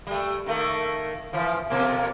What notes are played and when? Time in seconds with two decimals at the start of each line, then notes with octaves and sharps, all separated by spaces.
0.07 G3 A3
0.46 D#3 A3 A#3
1.33 E3 F3
1.70 F2 B2 A#3